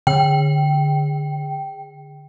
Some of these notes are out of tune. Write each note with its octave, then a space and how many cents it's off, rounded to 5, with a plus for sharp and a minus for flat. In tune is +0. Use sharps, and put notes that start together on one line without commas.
D3 +0 G5 -10